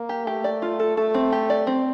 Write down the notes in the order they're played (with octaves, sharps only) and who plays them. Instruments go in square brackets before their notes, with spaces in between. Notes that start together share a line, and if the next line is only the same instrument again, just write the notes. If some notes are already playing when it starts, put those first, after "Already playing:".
Already playing: [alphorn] A#3
[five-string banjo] G4
[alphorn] A3 [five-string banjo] G4
[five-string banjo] D5
F4
A4
[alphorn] A3 [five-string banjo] A4
[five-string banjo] C4
G4
D5
C4